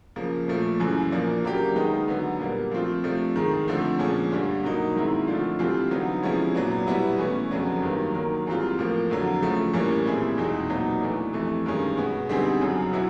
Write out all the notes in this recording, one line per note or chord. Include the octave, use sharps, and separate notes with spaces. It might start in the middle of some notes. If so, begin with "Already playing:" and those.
C#3 F3 A#3
A#2 F3 A3
F#2 C#3 E3
A#2 F3 A#3 D4
C#3 F#3 A#3 D4 G4
D#3 G#3 B3 D#4
D3 F#3 B3
A#2 G3 A#3
F3 A3 C4 F4
C3 F3 A3 D4
G#2 D#3 G#3
D3 F3 A3 C4
A#2 F3 G#3 C#4
G2 D3 G3
B2 F#3 A#3 D#4
G#2 D#3 G#3 C4 E4
D3 F3 A3 D4 F4
C3 E3 G3 C4 F4
D3 F#3 B3 D#4
C3 F3 G#3 C#4 E4
A#2 F#3 B3 D4
B2 G3 B3 E4
E3 A3 C#4
F2 C#3 F#3 B3 D4
G2 D#3 F#3 A#3
D#3 F#3 A#3
G#2 E3 G3 C4 F4
A2 F3 A#3
F2 D3 F#3
C#3 F3 A3
A2 E3 G3 A#3 C#4
A#2 G3 C4 E4 G#4
E2 B2 G#3 C4 D#4
A#2 F#3 B3 D#4
E3 A3 D4
F2 C3 E3 A3
G2 D#3 G#3 C#4
B2 G#3 B3
D3 G3 C4 D#4 G#4
F#2 C#3 F#3
B2 F#3 B3 E4